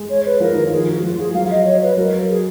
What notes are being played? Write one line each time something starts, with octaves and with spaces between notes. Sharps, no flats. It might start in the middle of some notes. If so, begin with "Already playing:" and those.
Already playing: G#3
C#5
B4
F3 A#4
D#3
F3
G#4
F#4
F3 F4
F3 G#4
F#3 F5
D#5
C#5
B4
F#3 A#4
G#4